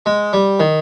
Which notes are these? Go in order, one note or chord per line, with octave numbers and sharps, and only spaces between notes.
G#3
G3
D#3